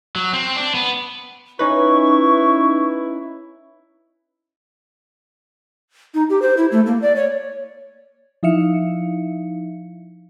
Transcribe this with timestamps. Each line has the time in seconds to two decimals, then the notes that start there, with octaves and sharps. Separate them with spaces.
0.16 F#3
0.33 C4
0.56 D4
0.75 B3
1.59 C#4 D#4 E4 B4 C#6
6.14 D#4
6.30 G4
6.42 C5
6.57 E4
6.72 A3
6.86 A#3
7.02 D5
7.16 C#5
8.43 F3 D#4 E4 E5 F5 C#7